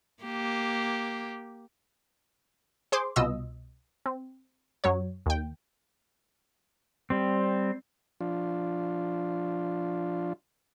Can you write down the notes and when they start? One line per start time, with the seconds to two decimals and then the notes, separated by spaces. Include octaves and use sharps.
0.24 A#3 G4
2.92 G#4 C5 C6 D6
3.16 C2 B2 F4 D#5 E6
4.06 C4
4.84 F#2 F#3 C#5
5.26 D#2 G5
7.10 G3 C4
8.21 F3 D4 F4